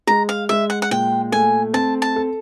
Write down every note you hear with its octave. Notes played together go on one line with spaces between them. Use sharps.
G#3 A#5
F5
G#3 E5
F#5
F#5
A#2 G5
A3 G#5
C4 A5
A5
A4